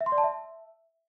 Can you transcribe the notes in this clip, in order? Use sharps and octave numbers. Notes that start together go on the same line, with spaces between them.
E5
C6
D5
A5
E5